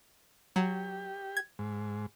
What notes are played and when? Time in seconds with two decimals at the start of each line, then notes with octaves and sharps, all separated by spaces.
0.56 F#3 G4
1.37 G#6
1.59 G#2